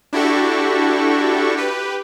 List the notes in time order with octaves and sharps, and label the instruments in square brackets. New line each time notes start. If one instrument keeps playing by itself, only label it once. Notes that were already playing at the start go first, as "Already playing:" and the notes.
[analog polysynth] D4 E4 F#4 G4 A4 C#6
G4 B4